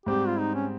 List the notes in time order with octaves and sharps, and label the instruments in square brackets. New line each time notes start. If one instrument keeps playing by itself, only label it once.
[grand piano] G#2 G3 C4 [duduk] G4
[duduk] F4
D#4
C#4